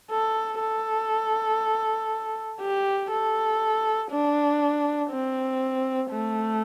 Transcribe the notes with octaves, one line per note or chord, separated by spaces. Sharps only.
A4
A4
G4
A4
D4
C4
A3